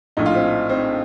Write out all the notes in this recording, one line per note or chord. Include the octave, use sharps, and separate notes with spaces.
A#1 A2 D#4
F4
C4 D#4
C4 D#4